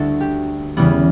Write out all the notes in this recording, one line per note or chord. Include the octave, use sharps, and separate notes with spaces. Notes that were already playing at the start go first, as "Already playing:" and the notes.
Already playing: D2 D3 G3 E4 F#4 A4
G4
E2 C#3 E3 G3 B3